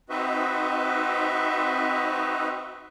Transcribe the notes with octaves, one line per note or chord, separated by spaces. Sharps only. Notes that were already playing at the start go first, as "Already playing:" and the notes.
C4 D#4 F#4 B4 D#5 E5